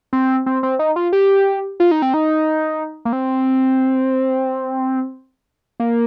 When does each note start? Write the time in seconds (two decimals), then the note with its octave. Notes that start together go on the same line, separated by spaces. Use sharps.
0.13 C4
0.46 C4
0.63 C4
0.79 D#4
0.96 F4
1.13 G4
1.80 F4
1.91 D#4
2.02 C4
2.14 D#4
3.05 A#3
3.13 C4
5.80 A#3